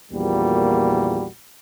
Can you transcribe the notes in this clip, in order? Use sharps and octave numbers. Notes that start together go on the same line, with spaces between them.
A#1 E2 A#2 G3 A#3 F#4